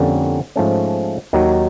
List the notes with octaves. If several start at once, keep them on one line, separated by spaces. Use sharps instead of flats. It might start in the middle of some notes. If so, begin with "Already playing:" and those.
Already playing: F2 D3 G3 A#3 C#4
G#2 F3 A3 C#4
D#2 D#3 F#3